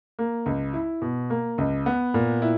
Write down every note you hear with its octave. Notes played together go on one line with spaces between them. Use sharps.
A#3
C#2
E4
B2
A#3
C#2
B3
A#2
E4